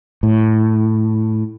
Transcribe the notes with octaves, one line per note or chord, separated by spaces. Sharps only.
A2